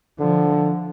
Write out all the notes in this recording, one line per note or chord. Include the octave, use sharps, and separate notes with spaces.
D3 F3